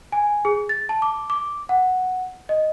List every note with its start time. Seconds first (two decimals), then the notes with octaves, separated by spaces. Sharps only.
0.12 G#5
0.45 G#4
0.69 A6
0.89 A5
1.02 D6
1.30 D6
1.69 F#5
2.49 D#5